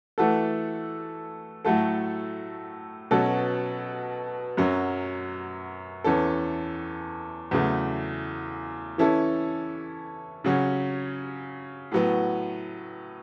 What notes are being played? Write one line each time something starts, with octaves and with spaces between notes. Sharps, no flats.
E3 A3 F#4 A4
A2 F#3 A3 F#4 A4
B2 F#3 C#4 A4
F#2 F#3 C#4 F#4
E2 E3 C#4 A4
E2 C#3 F#3 A3
E3 C#4 E4 A4
C#3 F#3 C#4
A2 F#3 B3